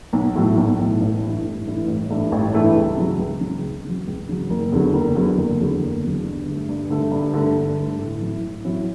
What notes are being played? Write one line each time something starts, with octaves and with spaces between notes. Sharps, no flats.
B1
A2 F#3 A3
B1
A2 F#3 A3
A1
G2 E3 A3 E4
A1
G2 E3 A3 E4
A1
G2 E3 A3 E4
A1
G2 E3 A3 E4
C#2
C#3 F#3
C#2
C#3 F#3
C#2
C#3 F#3
C#2
C#3 F#3
F#1
E2 D3 F#3
F#1
E2 D3 F#3
F#1
E2 D3 F#3
F#1
E2 D3 F#3
G2
D3 A3
G2
D3 A3
G2
D3 A3
G2
D3 A3
A2
F#3 C#4 E4
A2
F#3 C#4 E4